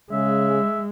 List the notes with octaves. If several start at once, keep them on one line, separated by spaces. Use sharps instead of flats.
C#3 G#3 E5